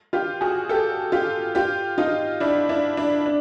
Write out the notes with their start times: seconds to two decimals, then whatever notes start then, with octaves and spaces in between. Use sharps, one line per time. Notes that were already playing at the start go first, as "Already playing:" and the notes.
0.13 F4 G4
0.41 F#4 G#4
0.69 G4 A4
1.12 F4 G4
1.55 F4 G4
1.98 D#4 F4
2.40 D4 E4
2.69 D4 E4
2.97 D4 E4
3.26 D4